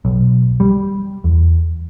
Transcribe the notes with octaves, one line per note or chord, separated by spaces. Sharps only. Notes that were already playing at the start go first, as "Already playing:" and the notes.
B1
G3
E2